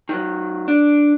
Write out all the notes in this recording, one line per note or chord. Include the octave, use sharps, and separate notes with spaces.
D#3 E3 F#3
D4